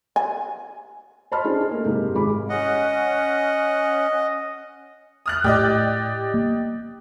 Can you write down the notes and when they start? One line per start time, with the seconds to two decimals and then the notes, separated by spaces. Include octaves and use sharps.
0.16 G#5
1.32 C5 D#5 A5 B5 C6 F6
1.44 C#4 D4 G#4
1.69 A3 A#3 D#4
1.84 F#1 G#2 C3 G4
2.15 G#1 G#3 B5 D6
2.49 C#4 D#5 F#5
5.26 D#6 F6 F#6
5.44 A2 G4 D5 D#5
6.34 A#3